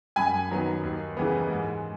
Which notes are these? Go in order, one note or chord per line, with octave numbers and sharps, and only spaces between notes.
F#2 G#5 B5
D#3 F#3 B3
D#2
C#3 E3 G#3 B3
G#2